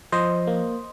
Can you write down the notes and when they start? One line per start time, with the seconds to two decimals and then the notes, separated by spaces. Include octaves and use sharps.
0.12 F3 C5 D#5
0.47 A#3